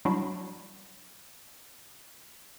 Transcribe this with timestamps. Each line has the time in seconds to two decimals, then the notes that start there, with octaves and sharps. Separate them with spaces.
0.05 F#3 G3 D4 E4 F#4